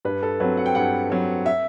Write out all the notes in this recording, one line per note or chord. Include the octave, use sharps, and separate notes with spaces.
G2 B4
A4
F#3 C4 B4
F#5
G5
G2 F#5
F#3 C4
E5